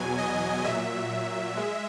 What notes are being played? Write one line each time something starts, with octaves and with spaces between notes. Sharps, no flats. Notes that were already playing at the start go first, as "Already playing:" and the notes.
Already playing: E2 B2 F#3 G#5
D#5
A#2 F#3 E5
G#3